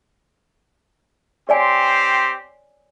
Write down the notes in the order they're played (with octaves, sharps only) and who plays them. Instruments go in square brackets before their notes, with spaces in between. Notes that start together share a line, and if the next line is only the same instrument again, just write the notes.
[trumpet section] C4 G4 C6 [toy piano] C#5 D5 G#5